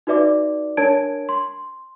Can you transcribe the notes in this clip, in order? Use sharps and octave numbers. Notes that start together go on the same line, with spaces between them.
D#4 F#4 B4 D5 E5 D6
D4 A#4 C#5 A5 G#6 D7
C6